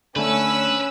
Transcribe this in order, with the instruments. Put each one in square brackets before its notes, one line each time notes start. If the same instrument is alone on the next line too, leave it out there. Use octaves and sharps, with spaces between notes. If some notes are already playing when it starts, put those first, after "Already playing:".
[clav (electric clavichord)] D3 A3 [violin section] C#4 E6 [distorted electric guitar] B4